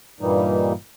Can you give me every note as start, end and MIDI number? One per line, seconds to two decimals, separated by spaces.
0.21 0.73 43
0.21 0.73 46
0.21 0.73 52
0.21 0.73 55
0.21 0.73 58
0.21 0.73 63